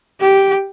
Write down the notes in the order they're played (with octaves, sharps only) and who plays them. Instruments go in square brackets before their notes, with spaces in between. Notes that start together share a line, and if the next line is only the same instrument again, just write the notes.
[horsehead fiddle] G4